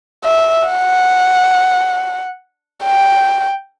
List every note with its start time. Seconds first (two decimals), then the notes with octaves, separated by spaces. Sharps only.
0.24 E5
0.68 F#5
2.84 G5